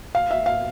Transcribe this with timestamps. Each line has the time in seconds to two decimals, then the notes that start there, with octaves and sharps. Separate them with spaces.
0.15 F5
0.31 E5
0.46 F5